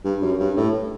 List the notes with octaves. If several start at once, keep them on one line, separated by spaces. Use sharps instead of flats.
G2
F#2
G2
A2